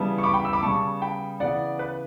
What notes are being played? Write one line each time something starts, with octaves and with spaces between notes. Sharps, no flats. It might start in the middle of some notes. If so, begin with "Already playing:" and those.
Already playing: C#3 E3 G3 B3 A5
C#6
B5 D6
G5 B5
E6
B5 D6
C#3 G3 B3 A5 C#6
G5 B5
C#3 E3 B3 D5 F#5
B4